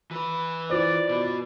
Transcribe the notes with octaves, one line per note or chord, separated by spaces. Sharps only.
E3 B4
E4 F4 C5 D5
B2 B3